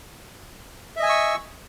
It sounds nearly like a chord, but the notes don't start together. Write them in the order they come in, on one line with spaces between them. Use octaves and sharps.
E5 D#5 G#5 E6 C#6